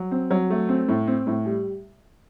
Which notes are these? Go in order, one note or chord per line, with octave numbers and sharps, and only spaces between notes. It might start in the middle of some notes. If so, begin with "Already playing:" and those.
Already playing: F#3
C4
F#3
A3
C4
A2
C4
A2
G3